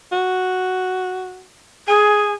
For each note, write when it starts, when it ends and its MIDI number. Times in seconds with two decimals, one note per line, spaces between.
0.12 1.45 66
1.88 2.34 68
1.88 2.34 80